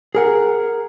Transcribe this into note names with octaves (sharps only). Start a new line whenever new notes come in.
G#4 A#4 F#5